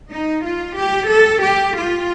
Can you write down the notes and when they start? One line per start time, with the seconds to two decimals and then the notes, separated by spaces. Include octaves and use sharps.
0.11 D#4
0.44 F4
0.77 G4
1.09 A4
1.43 G4
1.77 F4